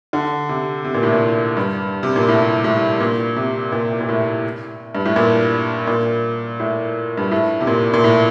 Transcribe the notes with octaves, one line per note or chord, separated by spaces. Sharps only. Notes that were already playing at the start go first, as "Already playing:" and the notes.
D3
C3
C3
A#2
A2
A#2
G2
C3
A#2
A2
A2
A#2
C3
A#2
A#2
A2
G2
A2
A#2
A#2
A2
G2
A2
C3
A#2
A#2
A2